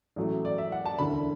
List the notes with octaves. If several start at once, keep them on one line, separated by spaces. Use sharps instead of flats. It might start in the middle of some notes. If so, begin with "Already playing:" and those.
A1 A2 F#3 A3
D5
E5
F#5
A5
E1 D2 D3 B5